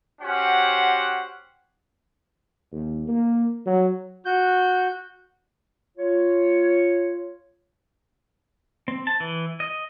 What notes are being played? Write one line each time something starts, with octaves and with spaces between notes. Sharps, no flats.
C#4 F#4 G4 C5 F#5
D#2
A#3
F#3
F#4 G6
F4 C#5
C4
A5
E3
D#5